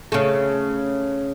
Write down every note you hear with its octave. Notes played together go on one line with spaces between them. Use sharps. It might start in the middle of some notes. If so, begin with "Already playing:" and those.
C#3 A3